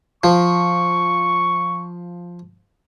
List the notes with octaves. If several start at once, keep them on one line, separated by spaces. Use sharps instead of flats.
F3 C#6